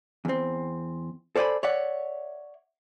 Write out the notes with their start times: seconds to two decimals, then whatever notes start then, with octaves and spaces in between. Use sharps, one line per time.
0.25 E2 C4
1.36 A4 C5 D5 E5 G#5 B5
1.63 C#5 D5 E5 F#5